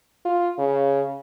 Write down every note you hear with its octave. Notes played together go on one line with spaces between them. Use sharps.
F4
C#3